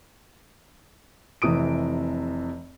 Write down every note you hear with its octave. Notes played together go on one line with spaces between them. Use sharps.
F1 C3 E3 D#6 D7